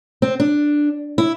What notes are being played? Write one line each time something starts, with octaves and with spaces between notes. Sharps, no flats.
C4
D4
E4